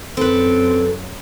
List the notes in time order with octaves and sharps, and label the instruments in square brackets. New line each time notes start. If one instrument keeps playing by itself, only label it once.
[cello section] F#2 [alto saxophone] C4 [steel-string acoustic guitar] A4 B4